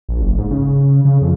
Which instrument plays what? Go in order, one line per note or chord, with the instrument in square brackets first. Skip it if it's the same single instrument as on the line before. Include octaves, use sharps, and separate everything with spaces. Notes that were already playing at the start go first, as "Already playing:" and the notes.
[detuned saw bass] A#1
F#1
G#2
C#3
C#3
C#3
F2